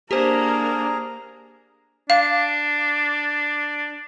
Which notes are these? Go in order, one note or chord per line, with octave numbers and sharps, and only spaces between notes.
A#3 D4 G4 G#4 A#4 C5 A#5
D4 F5